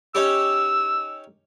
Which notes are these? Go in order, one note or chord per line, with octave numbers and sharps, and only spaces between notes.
C#4 D#4 G4 E6